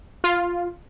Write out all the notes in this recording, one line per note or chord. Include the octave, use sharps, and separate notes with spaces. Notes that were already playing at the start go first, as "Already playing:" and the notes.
F4